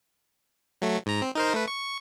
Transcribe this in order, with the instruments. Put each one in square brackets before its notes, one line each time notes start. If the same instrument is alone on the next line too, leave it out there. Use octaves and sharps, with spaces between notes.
[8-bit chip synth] F#3 A3
G#2 A#5
C4
D#4 A#4 C5
A3 B4
C#6